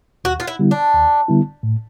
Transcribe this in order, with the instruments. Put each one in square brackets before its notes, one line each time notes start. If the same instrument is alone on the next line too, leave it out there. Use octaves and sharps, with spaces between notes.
[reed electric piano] D#2 [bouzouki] F#4
[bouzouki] F4
E4
[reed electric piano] D3 G3 B3 E4
[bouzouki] D4
[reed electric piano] D#2
D3 G3 B3 E4
A2